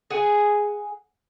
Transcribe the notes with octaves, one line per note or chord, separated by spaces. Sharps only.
G#4 F#5 G#5